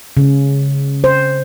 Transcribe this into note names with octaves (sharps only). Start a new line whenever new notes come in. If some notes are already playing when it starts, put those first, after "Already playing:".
C#3
C5